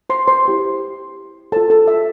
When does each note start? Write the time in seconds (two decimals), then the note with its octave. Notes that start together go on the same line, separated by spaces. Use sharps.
0.10 C5 C6
0.27 C5 C6
0.45 E4 G4 C5
1.52 F4 A4 C5 A5
1.70 A4 A5
1.88 E5